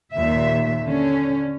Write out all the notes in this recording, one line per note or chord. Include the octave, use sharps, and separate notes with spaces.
D#2 A#2 E5
D3 C#4